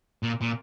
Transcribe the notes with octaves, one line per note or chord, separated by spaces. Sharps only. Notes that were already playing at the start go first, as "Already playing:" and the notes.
A#2
A#2